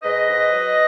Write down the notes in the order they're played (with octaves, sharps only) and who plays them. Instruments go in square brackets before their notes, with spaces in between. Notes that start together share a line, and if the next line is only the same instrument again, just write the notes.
[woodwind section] G#2 B4 D#5
G#2
F#3